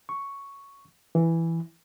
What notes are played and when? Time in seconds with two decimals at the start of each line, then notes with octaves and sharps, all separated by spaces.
0.09 C#6
1.15 E3